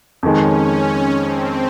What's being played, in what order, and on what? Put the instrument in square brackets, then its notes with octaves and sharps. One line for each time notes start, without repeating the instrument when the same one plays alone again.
[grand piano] F2 D#3 G#3 [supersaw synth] C#4
[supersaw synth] C4